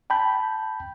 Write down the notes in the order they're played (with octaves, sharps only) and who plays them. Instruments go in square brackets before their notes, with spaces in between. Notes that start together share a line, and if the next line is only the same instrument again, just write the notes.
[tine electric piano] G5 A5 B5 G6